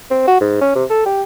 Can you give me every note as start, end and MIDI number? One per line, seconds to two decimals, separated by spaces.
0.11 0.23 60
0.27 0.37 66
0.41 0.57 44
0.61 0.71 61
0.75 0.84 48
0.90 1.01 69
1.06 1.23 67